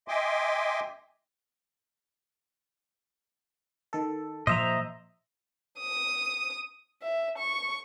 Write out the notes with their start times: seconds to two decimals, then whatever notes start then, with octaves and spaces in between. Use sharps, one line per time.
0.08 D#5 E5 G5 G#5 C6 D6
3.93 D#3 A4
4.47 A#2 F3 C5 D#5 E5 A#5
5.80 D#6
7.02 E5
7.38 C#6